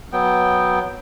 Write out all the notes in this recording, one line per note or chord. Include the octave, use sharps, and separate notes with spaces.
F#3 B3 G5